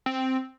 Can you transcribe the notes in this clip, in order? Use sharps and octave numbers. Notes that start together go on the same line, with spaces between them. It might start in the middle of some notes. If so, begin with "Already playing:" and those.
C4